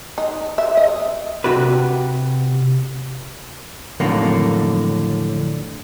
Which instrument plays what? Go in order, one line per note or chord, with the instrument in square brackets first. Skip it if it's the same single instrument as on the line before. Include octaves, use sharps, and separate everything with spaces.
[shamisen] D#4
E5
D#5
[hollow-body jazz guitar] C3 F#4 G4 B4
F2 A2 D3 D#3 F#3 A#3